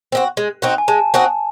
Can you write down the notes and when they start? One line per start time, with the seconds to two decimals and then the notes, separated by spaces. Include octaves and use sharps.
0.12 C4 D#4 F#4
0.37 G#3
0.62 C4 D#4 F#4
0.78 G#5
0.88 G#3 A5
1.14 C4 D#4 F#4